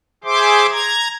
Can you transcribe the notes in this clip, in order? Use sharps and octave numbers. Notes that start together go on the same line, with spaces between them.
G#4 C5 E5 C6 D6
A#5 G#6